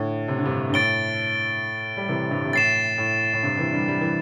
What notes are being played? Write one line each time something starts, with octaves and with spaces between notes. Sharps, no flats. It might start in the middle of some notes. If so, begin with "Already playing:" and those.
Already playing: A2 D3
C3
D3
G2 C3
G2
A2 A6 D7 G7
G3
C3 E3
G2 C3
C3
A2 A6 C7 E7
A2
A2
G2 C3
C3 E3
D3 G3
G3
E3